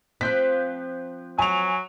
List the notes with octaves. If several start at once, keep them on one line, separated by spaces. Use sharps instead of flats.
F3 C4 F#6 G6 B6
F#3 G#5 F7